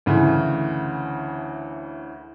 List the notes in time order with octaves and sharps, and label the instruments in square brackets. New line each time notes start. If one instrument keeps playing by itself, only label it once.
[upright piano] D2 C#3 E3